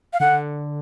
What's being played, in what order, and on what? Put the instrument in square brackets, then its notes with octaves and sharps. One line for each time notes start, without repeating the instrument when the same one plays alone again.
[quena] F5
[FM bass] D3 [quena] F#5